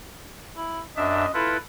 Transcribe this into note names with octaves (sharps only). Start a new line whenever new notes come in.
E4
F#2 D4 D#5 E5
E4 F4 A4 B4